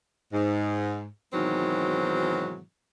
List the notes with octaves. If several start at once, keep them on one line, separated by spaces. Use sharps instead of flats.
G#2
G#2 B2 D#3 E3 F#3 C4